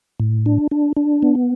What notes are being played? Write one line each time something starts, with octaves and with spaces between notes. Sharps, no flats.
A2
D4
D4
D4
B3